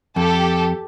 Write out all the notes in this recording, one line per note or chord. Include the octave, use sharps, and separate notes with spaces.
F2 G4 A4